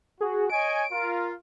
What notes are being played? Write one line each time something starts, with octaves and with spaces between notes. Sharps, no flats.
F#4 G#4
C#5 D#5 G#5 D7
F4 A#4